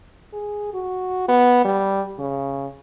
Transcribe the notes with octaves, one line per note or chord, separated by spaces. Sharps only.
G#4
F#4
B3
G3
C#3